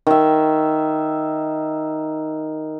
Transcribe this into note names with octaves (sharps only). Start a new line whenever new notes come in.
D#3 E5